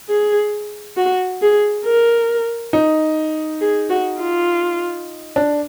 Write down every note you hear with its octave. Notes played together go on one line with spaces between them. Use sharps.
G#4
F#4
G#4
A#4
D#4
G#4
F#4
F4
D4